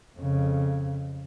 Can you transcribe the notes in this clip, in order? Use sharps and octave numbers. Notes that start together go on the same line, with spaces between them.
F2 C#3